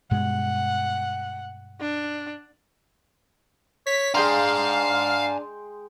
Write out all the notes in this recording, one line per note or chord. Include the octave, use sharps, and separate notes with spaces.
G2 B2 G#3 F#5
D4
C#5 B6
G#3 D4 F5 G5 G#5 A#5 C6